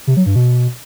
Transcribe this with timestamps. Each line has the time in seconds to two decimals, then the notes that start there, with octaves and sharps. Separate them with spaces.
0.07 C3
0.17 F#3
0.26 G2
0.36 B2